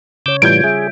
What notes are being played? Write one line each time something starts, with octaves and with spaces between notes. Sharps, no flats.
C#3 C#5 D6 E6 G6
A2 E3 G3 F4 G6 G#6 D7
G3 G#4 E5